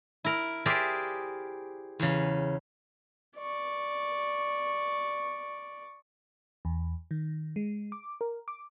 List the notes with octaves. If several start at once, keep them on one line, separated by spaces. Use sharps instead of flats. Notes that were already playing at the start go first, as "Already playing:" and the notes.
E4 A#4
G4 G#4 A#4 C5 D5 E5
E2 C#3
D5 C#6
E2
D#3
G#3
D6
A#4
D6